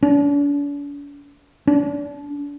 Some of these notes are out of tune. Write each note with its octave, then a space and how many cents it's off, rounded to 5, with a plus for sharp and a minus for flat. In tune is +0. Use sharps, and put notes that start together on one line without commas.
D4 -45
D4 -35